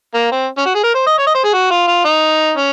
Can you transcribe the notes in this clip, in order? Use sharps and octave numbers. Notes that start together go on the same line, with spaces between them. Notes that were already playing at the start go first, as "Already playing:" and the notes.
A#3
C4
C#4
F#4
G#4
A#4
C5
D#5
C#5
D#5
C5
G#4
F#4
F4
F4
D#4
C#4